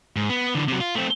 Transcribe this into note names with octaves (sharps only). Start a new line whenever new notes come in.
G#2
B3
D3 E3
C3 F#3
F4
A3 C4